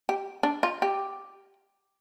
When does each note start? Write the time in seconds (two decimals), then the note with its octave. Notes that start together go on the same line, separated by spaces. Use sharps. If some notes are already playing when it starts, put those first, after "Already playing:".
0.09 G4
0.43 D4
0.63 F4
0.82 G4